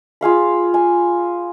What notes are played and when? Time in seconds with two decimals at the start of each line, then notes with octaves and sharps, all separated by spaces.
0.21 F4 G#4 F5 B5
0.74 G#5